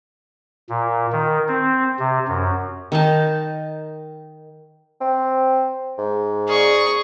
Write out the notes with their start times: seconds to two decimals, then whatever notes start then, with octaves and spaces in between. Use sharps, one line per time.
0.69 A#2
1.12 D#3
1.48 C4
1.99 C3
2.28 F#2
2.92 D#3 D#4 A5
5.01 C4
5.98 G#2
6.48 A#3 G#4 D5 C#6